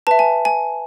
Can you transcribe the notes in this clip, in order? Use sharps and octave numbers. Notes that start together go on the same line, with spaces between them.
B4 E5 A5
G#5
G#5